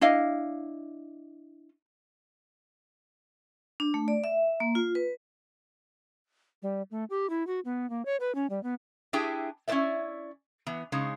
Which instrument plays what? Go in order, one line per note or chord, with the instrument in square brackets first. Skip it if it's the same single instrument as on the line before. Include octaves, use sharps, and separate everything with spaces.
[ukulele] D4 E4 D#5 F5
[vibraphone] D4
A3
D5
E5
A#3
F4
B4
[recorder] G3
A3
G4
E4
F#4
B3
A#3
C#5
B4
C#4
G3
B3
[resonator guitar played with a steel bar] D4 E4 G4 G#4 G5 G#5
C#4 E4 F4 C5 D5 E5
E3 B3
C#3 G#3 D#4 G#4